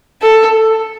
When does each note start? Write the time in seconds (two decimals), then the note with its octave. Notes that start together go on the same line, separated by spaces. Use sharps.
0.22 A4